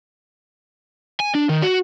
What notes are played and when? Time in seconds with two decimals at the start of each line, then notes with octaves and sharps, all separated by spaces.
1.20 G#5
1.35 D4
1.49 D#3
1.62 F#4